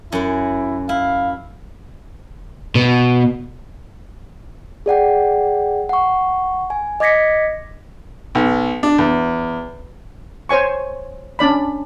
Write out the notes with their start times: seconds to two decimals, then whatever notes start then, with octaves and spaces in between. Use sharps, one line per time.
0.12 F#2 E4 F#4
0.89 E4 F5
2.75 B2
4.86 G#4 D5 F#5 G5
5.89 F#5 C#6
6.70 G#5
7.00 D#5 D6 G#6 A#6 B6 C#7
8.35 B1
8.83 D4
8.98 E2
10.49 C5 C#5 G#5 C#6
11.39 C#4 D4 D5 B5